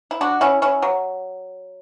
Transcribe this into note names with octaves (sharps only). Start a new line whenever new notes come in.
E4
D4 F#4
C#4 E4
C#4 E4
F#3